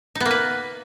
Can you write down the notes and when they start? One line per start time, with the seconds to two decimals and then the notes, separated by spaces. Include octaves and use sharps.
0.15 D#4
0.20 B3
0.26 A#3
0.31 B4